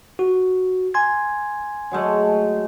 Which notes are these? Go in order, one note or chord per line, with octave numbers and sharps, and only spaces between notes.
F#4
G#5 C6 G#6
F#3 G#3 A3